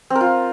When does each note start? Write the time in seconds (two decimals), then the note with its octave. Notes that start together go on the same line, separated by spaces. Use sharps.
0.10 C4
0.15 A#4
0.21 F4